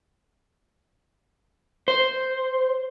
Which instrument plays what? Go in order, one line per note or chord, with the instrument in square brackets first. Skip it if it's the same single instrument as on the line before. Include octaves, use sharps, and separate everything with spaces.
[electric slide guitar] C5